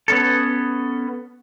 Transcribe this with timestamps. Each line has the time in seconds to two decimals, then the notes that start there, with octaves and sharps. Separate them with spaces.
0.08 B3 C#4 A4